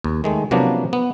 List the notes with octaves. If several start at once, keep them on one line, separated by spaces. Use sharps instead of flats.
D#2
D#3 G#3 A3
C3 F3 F#3 A#3 B3 D4
B3